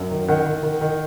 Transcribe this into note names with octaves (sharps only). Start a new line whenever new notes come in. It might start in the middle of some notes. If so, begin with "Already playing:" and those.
Already playing: F#2
D#3
D#3 F#5
D#3
D#3
D#3